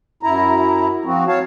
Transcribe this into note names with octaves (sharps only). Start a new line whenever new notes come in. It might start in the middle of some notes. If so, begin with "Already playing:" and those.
F#2 E4 A#5
F3 C4 F#4
C#5 F5 A5